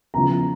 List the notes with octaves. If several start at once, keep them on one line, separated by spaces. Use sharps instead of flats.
E2 C#3 F3 A#5